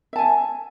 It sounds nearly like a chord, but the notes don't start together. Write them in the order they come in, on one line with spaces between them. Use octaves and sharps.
E5 A5 G#5